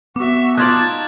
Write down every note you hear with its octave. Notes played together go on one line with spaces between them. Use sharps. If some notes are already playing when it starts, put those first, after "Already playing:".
B3 F#4 E5 D6
D#4 F4 D5 A5 F#6 G#6 F#7